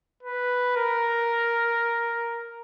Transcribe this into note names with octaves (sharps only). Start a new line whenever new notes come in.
B4
A#4